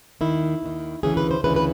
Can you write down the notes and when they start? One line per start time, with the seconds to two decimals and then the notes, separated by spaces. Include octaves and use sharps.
0.21 D#2 D#3 E4
0.62 D#2 D#3
1.03 D2 C#3 E3 G#4
1.17 B4
1.31 C5
1.44 D2 C#3 E3 B4
1.56 B4